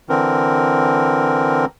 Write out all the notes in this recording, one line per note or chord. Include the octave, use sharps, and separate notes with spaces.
D3 E3 C4 A#4